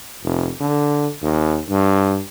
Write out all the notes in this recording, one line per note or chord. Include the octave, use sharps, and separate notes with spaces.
F1
D3
D#2
G2